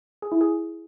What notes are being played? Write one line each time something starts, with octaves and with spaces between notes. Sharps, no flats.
G#4
E4
G#4